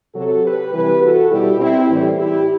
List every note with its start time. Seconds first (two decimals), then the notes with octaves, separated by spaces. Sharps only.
0.15 C3 F#3 F#4 A4
0.44 G4 B4
0.73 C3 E3 G3 G4 B4
1.02 F#4 A4
1.31 B2 G3 E4 G4
1.60 C4 E4
1.90 A2 E3 G3
2.19 E4 G4